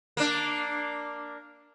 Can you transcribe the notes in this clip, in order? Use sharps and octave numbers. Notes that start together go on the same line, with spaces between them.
A#3 D4